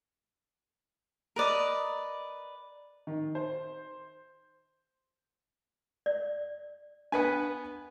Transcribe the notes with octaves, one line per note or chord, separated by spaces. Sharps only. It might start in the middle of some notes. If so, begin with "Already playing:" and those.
A#4 B4 D5 D#5
D#3
C5
D5
B3 D4 B4 G#5